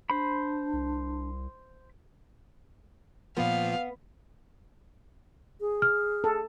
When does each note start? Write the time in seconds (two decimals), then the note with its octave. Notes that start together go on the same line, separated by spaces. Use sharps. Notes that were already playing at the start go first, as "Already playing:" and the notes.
0.10 D4 C5 B5
0.73 C2
3.37 A#2 F3 B3 F5
5.61 G#4
5.82 F6
6.24 A4